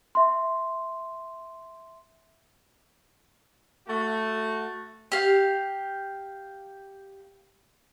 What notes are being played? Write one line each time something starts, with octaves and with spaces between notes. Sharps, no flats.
E5 C6
A3 F#4
G4 F5